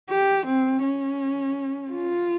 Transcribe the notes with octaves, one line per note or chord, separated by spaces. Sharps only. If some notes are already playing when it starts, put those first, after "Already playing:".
G4
C4
C#4
F4